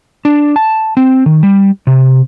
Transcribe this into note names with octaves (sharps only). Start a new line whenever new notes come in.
D4
A5
C4
D#3
G3
C3